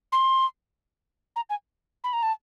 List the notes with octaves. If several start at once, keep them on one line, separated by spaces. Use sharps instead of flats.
C6
A#5
G#5
B5
A#5
A5